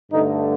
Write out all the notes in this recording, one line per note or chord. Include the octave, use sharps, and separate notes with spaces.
G2 D3 A3 D#4